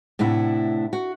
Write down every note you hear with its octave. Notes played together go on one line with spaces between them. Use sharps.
A2 C3 D4 E4 F#5
F#4